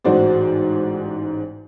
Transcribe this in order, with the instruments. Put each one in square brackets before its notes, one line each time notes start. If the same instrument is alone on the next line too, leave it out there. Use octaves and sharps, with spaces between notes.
[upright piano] A1 G#2 F#4 C5 D5